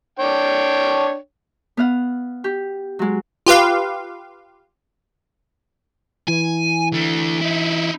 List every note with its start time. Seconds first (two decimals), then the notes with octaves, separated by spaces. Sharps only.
0.20 D4 C#5 G5
1.77 B3 F5 F#5
2.44 G4
2.99 F#3 G#3
3.46 F4 G4 B4 F5
6.27 E3 G#5
6.92 D3 A3
7.41 D#4 E4